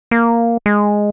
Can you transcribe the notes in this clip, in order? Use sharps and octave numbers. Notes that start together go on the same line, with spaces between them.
A#3
G#3